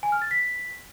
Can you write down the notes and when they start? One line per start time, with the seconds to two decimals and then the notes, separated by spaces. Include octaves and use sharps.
0.03 G#5
0.12 F6
0.22 A6
0.31 B6